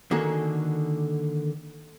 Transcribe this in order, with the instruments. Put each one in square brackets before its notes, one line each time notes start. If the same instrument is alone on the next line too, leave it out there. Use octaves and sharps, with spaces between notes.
[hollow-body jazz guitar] D3 D#3 A#3 F#4 G#4 A4